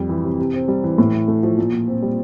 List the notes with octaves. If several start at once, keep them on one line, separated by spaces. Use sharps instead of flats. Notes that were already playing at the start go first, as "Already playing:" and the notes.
Already playing: F2 G3
E3
C3
C3
C4
G3
E3
A2
E4
A3
F3
A#2
A#2
C4
G3